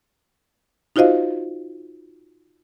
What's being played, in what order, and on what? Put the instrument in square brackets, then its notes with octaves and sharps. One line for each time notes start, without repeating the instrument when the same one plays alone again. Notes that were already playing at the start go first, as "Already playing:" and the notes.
[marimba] D#4 F4 F#4 C5 D#5 F5